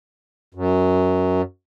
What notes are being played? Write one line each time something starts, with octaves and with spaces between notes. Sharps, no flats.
F#2